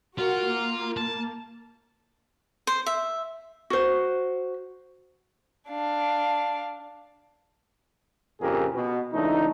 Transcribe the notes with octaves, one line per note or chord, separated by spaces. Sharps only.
F4 F#4 A#4 F#5
A#3
A5
C5
E5
F#4 C5
D4 F5
A#1 F2 C#3 G4 G#4 A#4
B2
C#2 E3 A3 D4 D#4